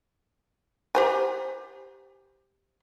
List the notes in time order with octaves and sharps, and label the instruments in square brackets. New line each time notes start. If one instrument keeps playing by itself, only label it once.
[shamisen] G4 C5 G#5